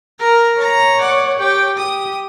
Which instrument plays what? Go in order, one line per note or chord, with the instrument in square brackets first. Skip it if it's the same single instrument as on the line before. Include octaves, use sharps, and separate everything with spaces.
[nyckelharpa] A#4 A#5
[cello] C#5 [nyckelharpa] A#5
[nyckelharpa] D5 F#5
G4 G5
[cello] G4 [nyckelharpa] D#6